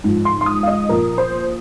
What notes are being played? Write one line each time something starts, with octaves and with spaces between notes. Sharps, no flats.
G#2 F3
C6
C6
D#6
F5
D#5
A#2 F3 A#4
C5